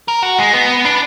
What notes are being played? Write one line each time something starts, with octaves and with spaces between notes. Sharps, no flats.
A#4
F#4
G#3
B3
D4